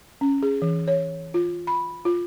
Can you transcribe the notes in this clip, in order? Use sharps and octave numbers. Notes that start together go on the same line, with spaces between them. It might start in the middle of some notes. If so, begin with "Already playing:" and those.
C#4
G#4
E3
C#5
F4
B5
F4